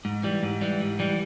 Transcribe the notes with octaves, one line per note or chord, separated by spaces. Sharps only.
G#2
E3 G3
G#2
E3 G3
G#2
E3 G3